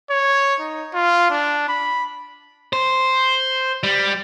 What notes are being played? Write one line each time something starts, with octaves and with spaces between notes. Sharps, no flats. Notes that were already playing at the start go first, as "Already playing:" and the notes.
C#5
D#4
F4
D4
B5
C5
G3